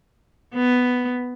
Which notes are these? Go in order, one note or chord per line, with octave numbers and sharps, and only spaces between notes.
B3